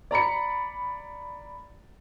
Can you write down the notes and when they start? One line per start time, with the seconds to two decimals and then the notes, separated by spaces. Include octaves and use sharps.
0.11 D5 A#5 B5 C#7